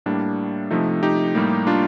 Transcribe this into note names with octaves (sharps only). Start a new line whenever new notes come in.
A2 G3 A#3 D4
C3 F3 A3 D#4
D#4 G4
A2 G3 A#3
D4 F4